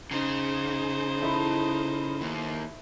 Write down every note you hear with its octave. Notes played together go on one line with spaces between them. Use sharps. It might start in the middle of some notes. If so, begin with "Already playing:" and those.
C#3 D#4 C5
E4 A4 D#5
D#2